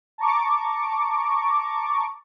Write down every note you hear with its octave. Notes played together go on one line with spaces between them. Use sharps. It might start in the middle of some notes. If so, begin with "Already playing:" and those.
A5 A#5 C#6 D6